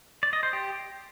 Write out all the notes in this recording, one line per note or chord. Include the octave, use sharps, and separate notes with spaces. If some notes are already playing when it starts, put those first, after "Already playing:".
D5
D#5
C5
G4